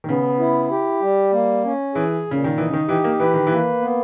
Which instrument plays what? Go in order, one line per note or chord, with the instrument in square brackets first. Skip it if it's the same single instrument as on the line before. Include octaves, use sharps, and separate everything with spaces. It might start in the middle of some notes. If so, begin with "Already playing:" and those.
[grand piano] D#3
[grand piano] C#3 [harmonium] B3
[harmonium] E4
G4
G3
A#3
C#4
[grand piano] E3 [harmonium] G#4
[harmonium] A#2 [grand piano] C#3
[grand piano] D#3
[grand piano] E3 [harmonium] D#4
[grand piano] C#3
D#3
[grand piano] E3 [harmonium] G4
[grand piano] A#3
[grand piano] E3 [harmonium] B4
[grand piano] D#3
[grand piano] E3 [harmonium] A#3
[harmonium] B3